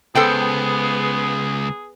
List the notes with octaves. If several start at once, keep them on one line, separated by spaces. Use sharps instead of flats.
C#2 B3 G#4 A4 C5 G5